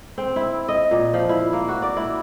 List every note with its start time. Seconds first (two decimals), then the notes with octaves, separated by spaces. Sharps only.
0.18 C4
0.36 E4
0.69 D#5
0.91 A#2
1.14 F3
1.29 E4
1.53 A#3
1.68 F#4
1.82 D5
1.96 E4